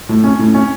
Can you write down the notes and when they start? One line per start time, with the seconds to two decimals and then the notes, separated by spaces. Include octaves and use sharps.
0.09 A2
0.24 C#4
0.39 A2
0.54 C#4